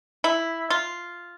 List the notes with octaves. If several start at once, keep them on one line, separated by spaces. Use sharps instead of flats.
E4
F4